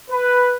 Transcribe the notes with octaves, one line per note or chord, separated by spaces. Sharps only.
B4